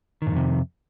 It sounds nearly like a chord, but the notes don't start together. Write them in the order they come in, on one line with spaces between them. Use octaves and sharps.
D#3 G#2 F2 C3